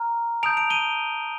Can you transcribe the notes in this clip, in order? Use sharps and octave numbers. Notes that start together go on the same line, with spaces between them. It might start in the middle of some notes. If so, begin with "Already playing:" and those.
Already playing: A#5 F6
A5 D#6 G6 D7 F7
D7 F7
D#7 G7